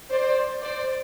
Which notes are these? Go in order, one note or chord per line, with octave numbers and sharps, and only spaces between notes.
C5 D5
C5 D5